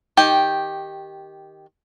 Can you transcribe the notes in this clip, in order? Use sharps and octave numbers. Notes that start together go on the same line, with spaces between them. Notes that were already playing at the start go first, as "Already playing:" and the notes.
D#3 G4 G5